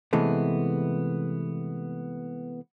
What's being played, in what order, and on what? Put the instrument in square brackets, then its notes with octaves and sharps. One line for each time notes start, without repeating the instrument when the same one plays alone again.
[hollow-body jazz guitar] C3 E3 G#3 A3 B3